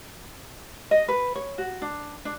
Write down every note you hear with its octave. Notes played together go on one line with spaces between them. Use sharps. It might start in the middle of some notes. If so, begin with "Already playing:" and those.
D#5
B4
C#5
F#4
D4
D4